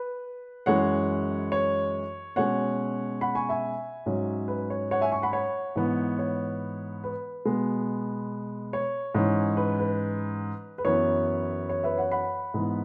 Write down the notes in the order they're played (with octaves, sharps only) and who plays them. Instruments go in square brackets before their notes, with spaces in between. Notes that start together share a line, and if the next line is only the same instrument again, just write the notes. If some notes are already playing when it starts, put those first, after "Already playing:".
Already playing: [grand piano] B4
F#2 E3 G#3 C#4 C#5 F#5
C#5
B2 G#3 C#4 C#5 F#5
F#5 B5
G#5 C#6
E5 G#5
G#2 F#3 C#4
B4
C#5
C#5 F#5
E5 G#5
G#5 C#6
F#5 B5
C#5 F#5
G#2 E3 B3
C#5
B4
B2 G#3 B3
C#5
G#2 E3 C#4
B4
B4
B4
F#2 E3 B3 C#5
C#5
B4 E5
C#5 F#5
F#5 B5
G#2 E3 B3